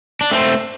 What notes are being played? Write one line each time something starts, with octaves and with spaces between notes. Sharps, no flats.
D4
A3 C4